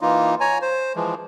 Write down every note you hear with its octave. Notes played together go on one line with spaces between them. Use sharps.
E3 A#3 D#4 F4
C#5 G#5 A#5
C5
E3 F3 G#3